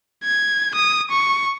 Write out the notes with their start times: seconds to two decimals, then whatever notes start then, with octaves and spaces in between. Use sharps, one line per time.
0.24 G#6
0.75 D#6
1.11 C#6